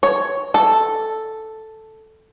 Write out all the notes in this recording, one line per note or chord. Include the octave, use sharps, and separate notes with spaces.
C#5
A4